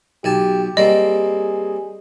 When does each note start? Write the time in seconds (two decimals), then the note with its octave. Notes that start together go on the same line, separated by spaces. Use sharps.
0.24 B1 G4 G#5 A5
0.77 G3 A#3 C4 G#4 D#5